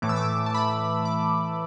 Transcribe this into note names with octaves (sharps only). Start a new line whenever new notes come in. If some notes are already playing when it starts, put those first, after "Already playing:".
A2 E3 A3 D6
E6
D6
A5
B5
D6